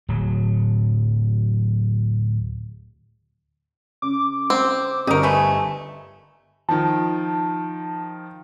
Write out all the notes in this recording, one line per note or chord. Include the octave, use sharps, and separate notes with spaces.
D1 F#3
C#3 D6
C4
G1 D#4 A#4 D#5 C#6
A3 B4 G#5
D#3 F3 A5